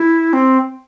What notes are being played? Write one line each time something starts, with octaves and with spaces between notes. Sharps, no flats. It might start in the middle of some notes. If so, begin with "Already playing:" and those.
Already playing: E4
C4